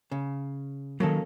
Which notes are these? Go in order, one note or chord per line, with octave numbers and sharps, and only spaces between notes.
C#3
D#3 F#3 A#3 C#4 A4